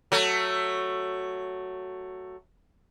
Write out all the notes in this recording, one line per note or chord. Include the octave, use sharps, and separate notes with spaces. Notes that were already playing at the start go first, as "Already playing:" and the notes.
F#3 A3